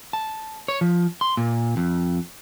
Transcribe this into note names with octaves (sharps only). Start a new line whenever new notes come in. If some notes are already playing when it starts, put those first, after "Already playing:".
A5
C#5
F3
C6
A#2
F2